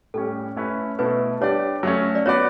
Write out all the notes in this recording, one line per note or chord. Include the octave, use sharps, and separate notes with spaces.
A2 G3 C#4 A4
A3 C#4 E4 B4
B2 A3 E4 A4 B4
G3 D4 G4 C#5 D5
F#3 A3 C#4
D5
B3 F#4 B4 C#5 D5